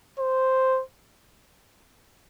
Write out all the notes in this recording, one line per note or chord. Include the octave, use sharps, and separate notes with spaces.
C5